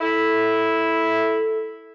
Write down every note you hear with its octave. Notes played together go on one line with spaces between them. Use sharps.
E4 A4